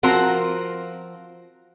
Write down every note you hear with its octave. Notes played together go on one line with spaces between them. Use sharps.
F3 C4 F4 F#4 A#4